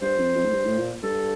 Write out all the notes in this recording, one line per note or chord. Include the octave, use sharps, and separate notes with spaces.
G2 C5
F2
F2
A2
G2
A2
A#2
G2 A4